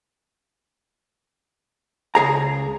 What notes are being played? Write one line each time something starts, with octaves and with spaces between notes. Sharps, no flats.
C#2 G#4 A#5